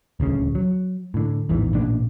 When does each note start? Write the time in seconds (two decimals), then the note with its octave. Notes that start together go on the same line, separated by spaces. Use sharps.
0.20 D#1 D2 C#3
0.55 F#3
1.14 A2 D3
1.49 A1 E2 G#2 E3
1.74 A1 A#2 D4